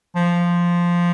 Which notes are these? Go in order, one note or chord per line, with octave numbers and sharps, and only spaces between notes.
F3